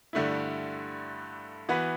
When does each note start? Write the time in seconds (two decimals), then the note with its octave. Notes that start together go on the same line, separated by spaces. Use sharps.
0.13 G2 D3 A3 E4
1.69 E3 B3 F#4 B4